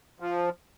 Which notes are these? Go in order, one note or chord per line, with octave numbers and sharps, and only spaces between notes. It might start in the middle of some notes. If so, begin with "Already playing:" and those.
F3